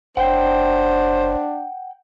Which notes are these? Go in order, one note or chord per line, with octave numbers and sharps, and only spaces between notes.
F#1 D4 C5 F#5 G5